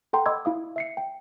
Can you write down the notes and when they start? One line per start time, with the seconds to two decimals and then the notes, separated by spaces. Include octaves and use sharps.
0.13 A4 F#5 G5 A#5 C6
0.26 D#5 B5 C6 D6 E6 G#6
0.45 E4 F5 D#6
0.76 E5 C7 C#7
0.97 G5